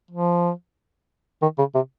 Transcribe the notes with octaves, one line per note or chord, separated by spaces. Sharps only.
F3
D#3
C#3
C3